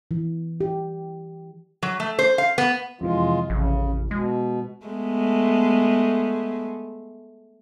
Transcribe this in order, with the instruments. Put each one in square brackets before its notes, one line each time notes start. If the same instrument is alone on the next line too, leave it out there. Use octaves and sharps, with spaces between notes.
[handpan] E3
G4
[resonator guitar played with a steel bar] F#3
A3
C5
F5
B3
[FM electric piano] F2 C3 E3 [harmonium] G#3 F4
[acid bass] A1 [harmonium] C#3
[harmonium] B2 [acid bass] G#3
[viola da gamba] G#3 A3 B3